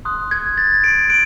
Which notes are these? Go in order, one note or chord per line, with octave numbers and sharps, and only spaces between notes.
C6 D#6 F#6
G#6
A6
D7
F#6 D7